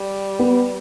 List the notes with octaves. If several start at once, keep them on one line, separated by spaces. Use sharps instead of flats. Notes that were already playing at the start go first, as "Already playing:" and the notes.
Already playing: G3
B3